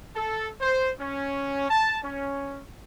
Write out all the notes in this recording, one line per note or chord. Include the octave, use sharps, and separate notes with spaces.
A4
C5
C#4
A5
C#4